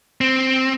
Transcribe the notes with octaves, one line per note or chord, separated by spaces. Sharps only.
C4